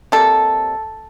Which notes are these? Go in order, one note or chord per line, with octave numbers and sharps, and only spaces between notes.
C3 G3 A#3 A4